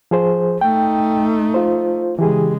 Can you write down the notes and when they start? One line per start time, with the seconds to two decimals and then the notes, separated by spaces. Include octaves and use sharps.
0.11 F3 G#4 C5
0.61 A3 D#4 G5
1.54 F4 C5
2.19 C#3 E3 G#3 G4 G#4